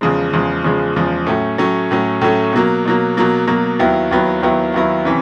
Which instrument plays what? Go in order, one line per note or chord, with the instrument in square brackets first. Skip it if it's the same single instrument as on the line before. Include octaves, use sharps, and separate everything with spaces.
[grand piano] E2 C#3 F3 G#3
E2 C#3 F3 G#3
E2 C#3 F3 G#3
E2 C#3 F3 G#3
A2 F#3 A3 C#4
A2 F#3 A3 C#4
A2 F#3 A3 C#4
A2 F#3 A3 C#4
B2 F#3 A#3
B2 F#3 A#3
B2 F#3 A#3
B2 F#3 A#3
D#2 D#3 F#3 B3 E4
D#2 D#3 F#3 B3 E4
D#2 D#3 F#3 B3 E4
D#2 D#3 F#3 B3 E4
C3 E3 C#4